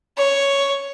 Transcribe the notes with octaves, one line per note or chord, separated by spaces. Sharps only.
C#5